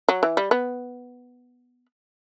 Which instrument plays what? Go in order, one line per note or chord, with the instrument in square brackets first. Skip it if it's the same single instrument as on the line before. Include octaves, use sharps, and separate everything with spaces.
[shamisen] F#3
E3
G3
B3